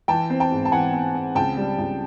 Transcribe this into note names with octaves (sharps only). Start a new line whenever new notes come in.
E3 G5 A5
C4
G5 A5
G#2
A5
E3 F#5 G#5
C4
C4
C#2 G5 A5
G3
C#2